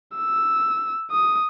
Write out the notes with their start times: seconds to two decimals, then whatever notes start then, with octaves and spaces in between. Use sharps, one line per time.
0.17 E6
1.11 D#6